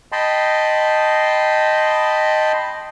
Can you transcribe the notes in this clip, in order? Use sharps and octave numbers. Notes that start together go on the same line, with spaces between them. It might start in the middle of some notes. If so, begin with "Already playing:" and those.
D#5 G5 A5 B5 C6